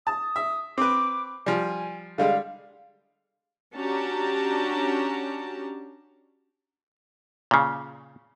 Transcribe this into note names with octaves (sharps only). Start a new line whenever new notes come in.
A5 D#6
E5
C4 B4 D6
F3 G3 G#5
D3 G3 G#3 F5
C#4 D4 F#4 G4 A5 A#5
A#2 C#3